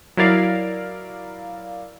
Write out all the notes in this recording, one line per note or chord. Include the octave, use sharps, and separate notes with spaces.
F#3 E4 A#4 D5 F5